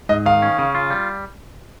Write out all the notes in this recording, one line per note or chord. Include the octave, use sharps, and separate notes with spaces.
G#2 D#5
D#3 F5
C#4
C#3
F4
G3